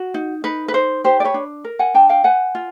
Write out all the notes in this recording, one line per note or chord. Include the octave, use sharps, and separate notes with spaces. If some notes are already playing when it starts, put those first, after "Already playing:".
Already playing: F#4
D#4
D#4 B4
B4
D#4 C5
G4 C5
D5
B4 C#5
D4
A#4
F#5 G#5
D4 G5 A5
F5 G5
B4 F#5 G#5
F4